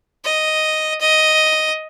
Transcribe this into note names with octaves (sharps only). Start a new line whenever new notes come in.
D#5
D#5